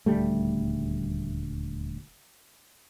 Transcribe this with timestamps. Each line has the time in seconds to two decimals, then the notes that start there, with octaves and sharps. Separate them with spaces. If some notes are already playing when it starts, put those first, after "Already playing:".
0.06 D#1 D2 G3 A3